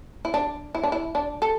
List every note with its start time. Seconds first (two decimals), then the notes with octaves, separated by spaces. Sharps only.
0.25 E4
0.34 D4
0.75 E4
0.83 D4
0.92 E4
1.15 D4
1.42 A4